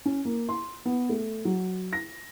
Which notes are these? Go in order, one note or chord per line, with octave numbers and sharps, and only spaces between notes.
C#4
A#3
C6
B3
A3
F#3
A#6